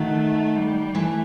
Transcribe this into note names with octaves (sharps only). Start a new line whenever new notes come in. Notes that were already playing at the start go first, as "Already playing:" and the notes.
Already playing: D#3 F#3 A3
G3
E3 A3